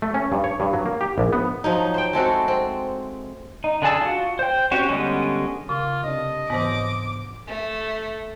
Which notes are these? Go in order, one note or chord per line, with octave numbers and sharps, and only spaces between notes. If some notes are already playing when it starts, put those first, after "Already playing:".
A3
C#4
G2
C#5
G2
F#3
A#3
G4
A#1
B3
F3 F#3 D#4
C5 G5
G#3 A3 C4 F#4
C4
D#4
D3 D4 G#4 A5 E6
F4 F#4
C5 G5
C4 C#4 F#4 G4
D3 G3 G#3 B3 C#4
C#3 F4
C3 D4 D#5
G#2 E3 B3 C5 D6
A3